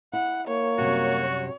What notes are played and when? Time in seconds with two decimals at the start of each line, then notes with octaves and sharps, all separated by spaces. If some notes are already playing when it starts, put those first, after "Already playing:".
0.13 E4 F#5
0.48 A#3 C#5
0.78 F#2 C3 G3 F#4